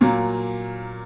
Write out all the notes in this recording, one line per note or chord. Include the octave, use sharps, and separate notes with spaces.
A#2 F#3 A#3